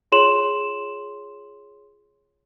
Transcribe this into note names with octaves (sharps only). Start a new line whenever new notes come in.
F4 G#4 C#5 C6 E7 F#7